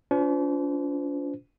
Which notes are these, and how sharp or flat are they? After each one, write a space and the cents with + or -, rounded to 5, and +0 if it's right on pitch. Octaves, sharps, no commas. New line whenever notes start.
D4 -45 F4 +0 C5 -40